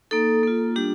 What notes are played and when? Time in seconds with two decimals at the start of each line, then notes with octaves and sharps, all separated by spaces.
0.11 A#3 D#4 A4
0.43 A#3 F4
0.76 G3 D4 F4 G4